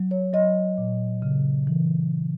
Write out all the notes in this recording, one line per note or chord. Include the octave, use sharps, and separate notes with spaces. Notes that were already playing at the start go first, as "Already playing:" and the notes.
Already playing: F#3
C#5
F#3 D#5
A#2
C#3
E3